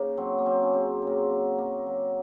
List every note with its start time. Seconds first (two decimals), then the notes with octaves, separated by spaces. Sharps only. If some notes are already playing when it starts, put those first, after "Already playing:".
Already playing: C#3 A#3 D#4
0.17 F#3 C4
0.39 A#3
0.46 F#3 C4
0.63 C#4
0.73 C#3 C4
1.02 C#3 A#3
1.16 C4
1.30 F#3
1.58 F#3 A#3
1.87 F#3